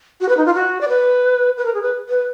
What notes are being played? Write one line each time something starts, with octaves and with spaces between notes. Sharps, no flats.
F#4
B4
D#4
F4
F#4
D5
B4
B4
A#4
G#4
B4
B4